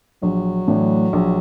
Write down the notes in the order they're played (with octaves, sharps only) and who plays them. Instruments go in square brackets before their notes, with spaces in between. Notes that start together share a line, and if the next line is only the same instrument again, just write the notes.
[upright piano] A#1 [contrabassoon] F#3
[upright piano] A2 E3 A3 D4
A#1